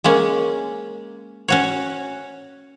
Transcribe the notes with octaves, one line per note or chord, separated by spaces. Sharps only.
G#3 A#3 C#4
C#4 F#4 C#5